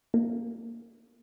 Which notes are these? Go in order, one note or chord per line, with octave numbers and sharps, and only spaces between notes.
A#3